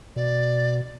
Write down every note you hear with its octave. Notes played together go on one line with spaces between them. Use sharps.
B2 D5